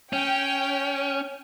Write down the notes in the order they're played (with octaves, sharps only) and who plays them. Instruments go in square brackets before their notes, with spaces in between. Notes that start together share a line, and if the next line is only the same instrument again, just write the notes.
[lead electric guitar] C#4 [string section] G5